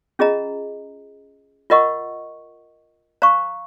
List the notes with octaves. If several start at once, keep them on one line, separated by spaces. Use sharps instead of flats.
C#4 F4 G#4 D#5 A#5
F4 A#4 D#5 F#5 C#6
C5 F5 A#5 C#6